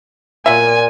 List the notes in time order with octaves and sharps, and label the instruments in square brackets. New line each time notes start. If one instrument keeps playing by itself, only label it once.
[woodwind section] A#2 [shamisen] F#3 E5 [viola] G#5